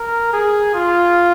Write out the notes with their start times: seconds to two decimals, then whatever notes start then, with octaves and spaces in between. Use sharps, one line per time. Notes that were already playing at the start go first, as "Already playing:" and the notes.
Already playing: A#4
0.33 G#4
0.74 F4